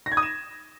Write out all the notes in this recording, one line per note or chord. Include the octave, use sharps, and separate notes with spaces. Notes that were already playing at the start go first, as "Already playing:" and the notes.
A#6
G#6
D#6
E7